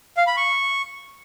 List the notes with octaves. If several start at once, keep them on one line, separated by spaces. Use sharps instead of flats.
F5
B5
C#6